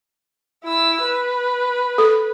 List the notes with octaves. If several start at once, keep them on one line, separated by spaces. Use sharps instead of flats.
E4 E6
B4
A4